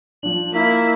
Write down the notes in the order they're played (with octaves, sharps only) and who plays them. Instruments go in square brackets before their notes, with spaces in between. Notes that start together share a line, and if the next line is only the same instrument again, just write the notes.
[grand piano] F3 D4 [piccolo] F#7
[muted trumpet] A#3 [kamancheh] E4 [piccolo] B6